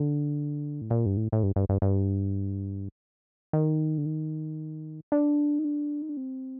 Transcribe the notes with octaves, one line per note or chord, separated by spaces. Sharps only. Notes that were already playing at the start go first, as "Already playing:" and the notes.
Already playing: D3
A2
A#2
G2
A2
A2
G2
G2
G2
G2
D#3
D3
D#3
D4
D#4
D4
D#4
D4
C4